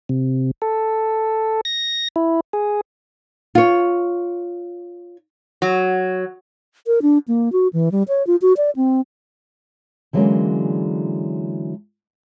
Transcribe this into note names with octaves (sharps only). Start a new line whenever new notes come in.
C3
A4
A#6
E4
G#4
F4 C#5
F#3
A#4
D4
A#3
F#4
E3
G3
C#5
F4
F#4
D5
C4
D3 E3 F#3 G#3 A#3 C#4